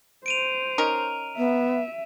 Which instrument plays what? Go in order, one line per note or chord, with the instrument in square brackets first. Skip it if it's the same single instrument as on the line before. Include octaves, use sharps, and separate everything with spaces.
[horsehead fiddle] C5 [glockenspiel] D7 D#7 F7
[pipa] C#4 D#4 A#4
[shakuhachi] B3 [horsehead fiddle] E5